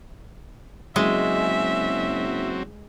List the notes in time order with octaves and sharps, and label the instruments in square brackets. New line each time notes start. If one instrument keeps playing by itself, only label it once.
[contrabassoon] F#1 [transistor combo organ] F#3 C4 [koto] G#3 [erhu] E5